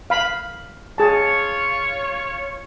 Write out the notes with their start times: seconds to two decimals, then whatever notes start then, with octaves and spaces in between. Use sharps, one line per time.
0.10 F5 B5
0.98 F4 G#4 C#5 A5